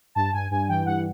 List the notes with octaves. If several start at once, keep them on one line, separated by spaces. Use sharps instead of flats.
G2 A5
G2 G#5
G2 G#5
E3 G5
G2 F#5